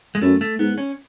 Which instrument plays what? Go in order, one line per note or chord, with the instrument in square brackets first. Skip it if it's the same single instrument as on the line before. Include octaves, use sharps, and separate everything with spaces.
[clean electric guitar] G#3
[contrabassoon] F#2 [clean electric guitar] A3
[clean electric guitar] A3
[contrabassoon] G#2 [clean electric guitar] B3
[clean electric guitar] C#4